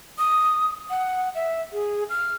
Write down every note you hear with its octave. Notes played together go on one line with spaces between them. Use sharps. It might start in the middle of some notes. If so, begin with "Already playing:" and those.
D#6
F#5
E5
G#4
F6